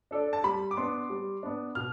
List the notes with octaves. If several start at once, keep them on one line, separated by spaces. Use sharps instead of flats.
D4 A4 D5
A5
G3 B5
D6
B3 D4 C6
G3
B3 D4
B2 F6